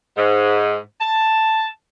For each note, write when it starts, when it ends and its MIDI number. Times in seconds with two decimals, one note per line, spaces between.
0.17 0.78 44
1.01 1.67 81